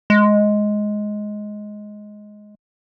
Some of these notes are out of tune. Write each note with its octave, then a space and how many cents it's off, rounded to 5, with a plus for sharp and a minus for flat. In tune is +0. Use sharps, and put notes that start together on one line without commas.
G#3 +10